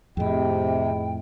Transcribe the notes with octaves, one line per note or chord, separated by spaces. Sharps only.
F2 A2 C3 G#4 D#5 G5 B5